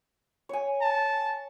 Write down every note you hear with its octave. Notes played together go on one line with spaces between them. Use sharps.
C#5 G#5
A5